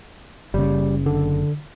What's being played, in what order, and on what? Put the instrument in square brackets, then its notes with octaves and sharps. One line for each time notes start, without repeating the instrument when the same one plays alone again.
[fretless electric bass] F#1 C#3 [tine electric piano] G3
[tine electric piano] D3